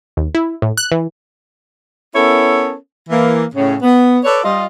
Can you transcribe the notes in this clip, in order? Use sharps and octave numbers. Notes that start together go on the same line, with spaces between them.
D#2
E4
A2
F#6
E3
B3 C#4 E4 A4 A#4 C#5
E3 A#3
A2 C#3 C#4
B3
A4 B4 C#5 D5
G3 F4 D#5